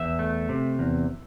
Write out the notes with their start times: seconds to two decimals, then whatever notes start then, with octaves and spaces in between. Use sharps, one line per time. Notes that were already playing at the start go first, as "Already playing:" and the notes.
Already playing: E2 E5
0.19 A3
0.49 C3
0.79 E2